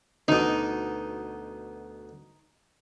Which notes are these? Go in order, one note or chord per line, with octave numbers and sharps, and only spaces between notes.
D2 B2 D#4